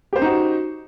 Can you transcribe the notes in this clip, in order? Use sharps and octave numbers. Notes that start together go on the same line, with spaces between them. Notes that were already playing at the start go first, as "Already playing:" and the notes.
C#4 D#4 F#4 G4 C5